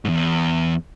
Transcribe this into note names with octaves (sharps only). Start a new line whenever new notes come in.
E2 G#2